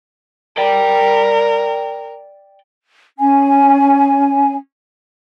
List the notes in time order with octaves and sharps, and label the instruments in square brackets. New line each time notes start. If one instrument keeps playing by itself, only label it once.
[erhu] A#4 [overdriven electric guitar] D5 G5
[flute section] C#4 G#5